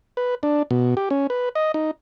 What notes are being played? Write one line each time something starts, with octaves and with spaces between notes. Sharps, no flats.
B4
D4
B2
G4
C#4
B4
D#5
D#4